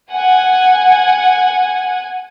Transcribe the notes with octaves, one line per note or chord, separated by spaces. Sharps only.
F#5 G#5